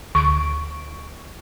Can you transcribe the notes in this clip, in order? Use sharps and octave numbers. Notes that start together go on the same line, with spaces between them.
D2 C#6 D7